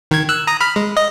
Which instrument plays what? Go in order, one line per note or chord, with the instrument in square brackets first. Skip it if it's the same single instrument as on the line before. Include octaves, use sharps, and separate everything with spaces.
[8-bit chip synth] D#3 G#6
E6 F#6
A#5 D#6
B5 F6
G#3
D#5